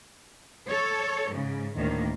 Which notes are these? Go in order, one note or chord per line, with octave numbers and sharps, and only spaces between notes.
A4 C#5
G#2 C#3
D2 A2 D#3 A#3